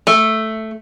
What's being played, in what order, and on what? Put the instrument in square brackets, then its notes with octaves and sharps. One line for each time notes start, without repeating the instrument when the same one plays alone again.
[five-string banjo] A3